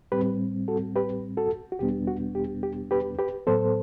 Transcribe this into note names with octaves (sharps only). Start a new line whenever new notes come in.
A2 G3 C4 G4 B4
F#4 A4
G4 B4
F#4 A4
F#4
E2 B2 G3 B3 D4 G4
F#4
G4
G4
G4 B4
G4 B4
A2 F#3 B3 A4 C5